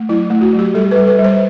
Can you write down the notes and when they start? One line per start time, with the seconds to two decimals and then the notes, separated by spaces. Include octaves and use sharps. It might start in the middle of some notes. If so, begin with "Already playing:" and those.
Already playing: A3
0.09 F#3 E4
0.30 A3
0.41 F#4
0.53 F#3
0.59 G4
0.74 G3 A4
0.91 G3 B4
1.07 B4
1.18 G3
1.24 C5